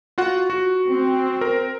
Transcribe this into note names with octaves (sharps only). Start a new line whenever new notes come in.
F4 F#4 F#5
F#4
C4
A#4